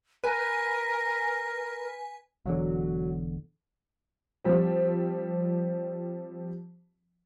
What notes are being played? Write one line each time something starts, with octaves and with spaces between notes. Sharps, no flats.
A#4 B4 G#5
E1 E2 D3 F#3
F3 G3 C4